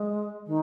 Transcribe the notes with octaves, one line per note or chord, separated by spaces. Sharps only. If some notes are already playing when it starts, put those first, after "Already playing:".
Already playing: G#3
D#3